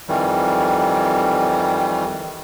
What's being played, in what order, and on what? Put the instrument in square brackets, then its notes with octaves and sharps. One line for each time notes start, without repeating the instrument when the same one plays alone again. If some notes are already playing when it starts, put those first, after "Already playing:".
[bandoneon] F2 D#3 E3 G3